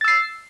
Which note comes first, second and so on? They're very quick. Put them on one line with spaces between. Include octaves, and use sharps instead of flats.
A6 E6 C7